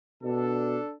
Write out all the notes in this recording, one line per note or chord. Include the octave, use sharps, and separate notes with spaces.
B2 D4 A4